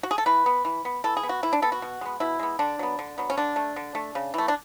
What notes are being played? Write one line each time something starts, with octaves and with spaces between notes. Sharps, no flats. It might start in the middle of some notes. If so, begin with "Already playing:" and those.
F#4
G#4
A4
E3 B4
B3
E3
B3
E3 A4
G#4
B3
F#4
E3 E4
D4
B3 A4
F#4
B2
G#3 B3
B2 E4
G#3 B3
D3 D4
F#3 B3
D3
F#3 B3
C#4
D3 D4
A3
D3
A3
C#3
E3 A3
D4